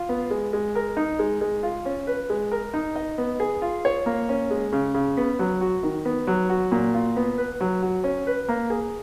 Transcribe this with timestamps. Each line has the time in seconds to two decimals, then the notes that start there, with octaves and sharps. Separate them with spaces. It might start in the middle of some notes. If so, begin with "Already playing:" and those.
Already playing: F4
0.09 B3
0.31 G#3
0.53 G#3
0.75 A#4
0.97 D#4
1.19 G#3
1.41 G#3
1.63 F4
1.85 C#4
2.07 B4
2.30 G#3
2.52 A#4
2.74 D#4
2.96 D#5
3.18 B3
3.40 G#4
3.62 F4
3.85 C#5
4.06 A#3
4.29 C#4
4.51 G#3
4.72 C#3
4.94 C#3
5.17 B3
5.39 F#3
5.61 F#4
5.83 D#3
6.05 B3
6.27 F#3
6.49 F#4
6.72 A#2
6.94 F4
7.16 B3
7.38 B4
7.61 F#3
7.82 F#4
8.04 C#4
8.27 B4
8.48 A#3
8.70 G#4